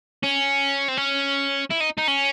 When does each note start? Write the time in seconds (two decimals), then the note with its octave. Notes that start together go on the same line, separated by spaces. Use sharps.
0.23 C#4
0.88 C4
0.98 C#4
1.71 E4
1.81 D#4
1.98 D#4
2.08 C#4